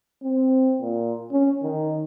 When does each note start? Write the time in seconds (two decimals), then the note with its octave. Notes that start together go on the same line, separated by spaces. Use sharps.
0.23 C4
0.80 A#2
1.32 C#4
1.63 D#3